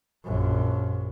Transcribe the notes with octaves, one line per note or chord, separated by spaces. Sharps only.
A#1 F#2